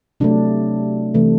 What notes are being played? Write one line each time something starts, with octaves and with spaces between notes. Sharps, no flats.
C3 F#3 A3 D4
C3 E3 A3